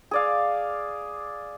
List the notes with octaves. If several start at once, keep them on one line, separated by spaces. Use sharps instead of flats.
G#4 D5 F5